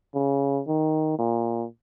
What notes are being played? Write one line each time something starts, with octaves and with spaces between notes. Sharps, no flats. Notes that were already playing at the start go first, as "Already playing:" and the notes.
C#3
D#3
A#2